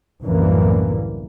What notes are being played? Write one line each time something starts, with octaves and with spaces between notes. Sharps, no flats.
C2 F#2 A2 D3 E3 A#3